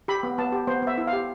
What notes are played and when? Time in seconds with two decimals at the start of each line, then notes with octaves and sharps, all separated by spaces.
0.08 G4 B5
0.23 B3
0.38 B3 A5
0.52 G4
0.67 B3 C5
0.82 B3 E5
0.98 E4
1.07 F5
1.13 G4